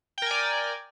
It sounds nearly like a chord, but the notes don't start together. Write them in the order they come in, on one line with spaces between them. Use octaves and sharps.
G5 A#4 G#5 D5